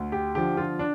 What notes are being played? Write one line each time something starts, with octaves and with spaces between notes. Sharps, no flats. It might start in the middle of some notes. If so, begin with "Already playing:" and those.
Already playing: D2
G4
D3 F3 G4
F4
D4